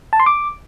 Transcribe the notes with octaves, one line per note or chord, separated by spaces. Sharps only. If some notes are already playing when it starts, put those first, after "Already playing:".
A5
C6
D6